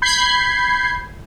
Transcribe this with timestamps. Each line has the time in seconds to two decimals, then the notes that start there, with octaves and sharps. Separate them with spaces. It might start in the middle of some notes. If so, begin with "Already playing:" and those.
0.02 B5 G6 G#6 C7